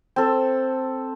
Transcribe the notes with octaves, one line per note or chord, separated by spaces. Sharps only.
C4 A4